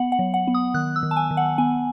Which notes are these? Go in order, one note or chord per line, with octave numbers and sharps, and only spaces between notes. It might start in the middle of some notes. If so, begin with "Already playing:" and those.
Already playing: B3 F#5
F#5
F#3
F#5
B3
D#6
D#3 F#6
E6
D#3
A5
G#5
D#3
F#5
B3 G#5